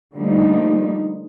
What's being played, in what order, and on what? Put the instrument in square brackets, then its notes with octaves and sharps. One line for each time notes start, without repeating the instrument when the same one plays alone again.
[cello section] D3 F3 G3 A3 A#3 D#4